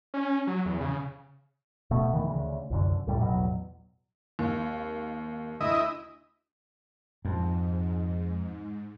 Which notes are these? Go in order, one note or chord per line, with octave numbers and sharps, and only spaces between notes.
C#4
F#3
E2
C#3
D#1 B2 A3 B3
D#2 D#3 E3
D2 C#3
C2 F#2 D3
C#2 A2 G3
A1 E2 B2 F#3
G#1 D#2
D2 E4 D#5
F2 G#2